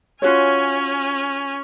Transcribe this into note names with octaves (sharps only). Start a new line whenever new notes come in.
C#4 F4 F#4 C#5 G#5 F6